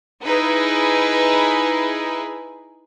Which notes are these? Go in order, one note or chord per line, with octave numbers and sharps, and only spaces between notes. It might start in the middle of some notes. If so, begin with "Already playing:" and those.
D#4 E4 G#4 B4